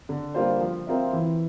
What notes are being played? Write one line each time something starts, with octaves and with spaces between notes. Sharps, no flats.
D3
G3 A#3 F4 C5
F3
C4 F4 A#4 E5
E3